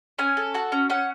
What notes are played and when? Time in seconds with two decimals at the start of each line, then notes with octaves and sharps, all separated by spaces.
0.19 C#4 G#5
0.37 A4
0.54 F#4 A5
0.72 C#4
0.90 C#4 F#5